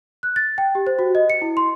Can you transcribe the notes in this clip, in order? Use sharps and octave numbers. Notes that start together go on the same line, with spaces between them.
F#6
A6
G5
G4
C5
F#4
D#5
C#7
E4
C6